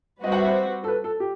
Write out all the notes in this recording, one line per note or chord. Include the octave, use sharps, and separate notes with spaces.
G3 C4 F#4 B4 D#5
F#5
E5
C5
A4
B4
A4
G4